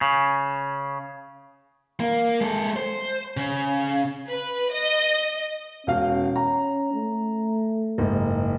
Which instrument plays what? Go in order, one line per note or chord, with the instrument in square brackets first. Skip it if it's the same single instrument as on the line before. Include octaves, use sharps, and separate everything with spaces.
[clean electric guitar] C#3
[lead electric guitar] A#3
G#3 A4
C5
C#3
[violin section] B4
D#5
[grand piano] E1 F5 [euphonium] C#4
[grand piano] A#5
[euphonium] A3
[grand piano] F#1 G#2